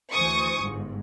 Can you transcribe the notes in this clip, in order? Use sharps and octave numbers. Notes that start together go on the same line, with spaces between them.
D2 E3 C5 G#5 C#6 D#6
G1 G#2